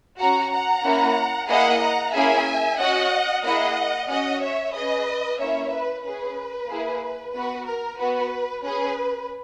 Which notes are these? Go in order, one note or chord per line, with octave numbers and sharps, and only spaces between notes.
C#4 F#4 F#5 A#5
F#5 A#5
A#3 C#4 E4
A#3 E4 G#4 D#5 F#5
F#5 A#5
A#3 C#4 E4 G#4 E5 G#5
C#4 F#4 D#5 F#5
A#3 E4 G#4 D#5 F#5
C#4 F#4 D#5 F#5
C#5 E5
C#4 G#4 B4 D#5
A#3 C#4 E4 C#5 E5
B4
C#4 G#4 B4
A#3 E4 G#4
B3 F#4 B4
A#4
B3 F#4 B4
C#4 G#4 B4